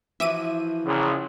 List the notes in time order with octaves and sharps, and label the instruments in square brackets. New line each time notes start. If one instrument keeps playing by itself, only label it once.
[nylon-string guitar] E3 F3 F#4 [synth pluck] E5 D6 D#7
[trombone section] A#1 [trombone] C#3